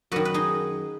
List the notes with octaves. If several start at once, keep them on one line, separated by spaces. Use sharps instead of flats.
F#2 D#3 F#4 B4
B4
D#4 G#4